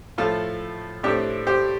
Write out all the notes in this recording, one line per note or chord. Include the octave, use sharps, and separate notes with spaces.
A2 F3 A3 F4 A4
A2 A3 C4 D4 G4
G4 C5